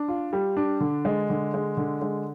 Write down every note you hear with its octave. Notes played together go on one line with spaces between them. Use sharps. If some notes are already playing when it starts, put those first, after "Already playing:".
Already playing: D4
F4
G3
D4
D3
G#3
D3
G#3
D3
G#3